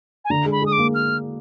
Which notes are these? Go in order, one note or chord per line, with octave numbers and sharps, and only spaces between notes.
G#5
D3 A#5
G#3
B5
G#3 D#6
D6
A#3
F6